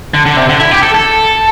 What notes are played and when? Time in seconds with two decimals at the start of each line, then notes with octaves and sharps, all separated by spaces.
0.14 D3
0.26 D3
0.37 C3
0.49 D3
0.60 E4
0.71 G4
0.83 A4
0.94 A4